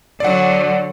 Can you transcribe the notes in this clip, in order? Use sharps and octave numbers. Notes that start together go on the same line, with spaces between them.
D3 F#3 D5 F#5